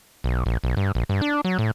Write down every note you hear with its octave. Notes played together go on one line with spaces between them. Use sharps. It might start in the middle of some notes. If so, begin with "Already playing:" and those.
B1
A#1
B1
G2
A#1
G2
D4
F#3
A2